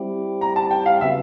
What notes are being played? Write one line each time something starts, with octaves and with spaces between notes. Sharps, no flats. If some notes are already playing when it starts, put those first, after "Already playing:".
Already playing: G3 C4 E4 G4
A#5
A5
G5
F5
C#3 F#3 B3 E5